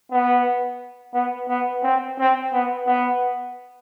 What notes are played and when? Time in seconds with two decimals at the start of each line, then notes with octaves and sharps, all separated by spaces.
0.11 B3
1.14 B3
1.48 B3
1.83 C4
2.19 C4
2.53 B3
2.87 B3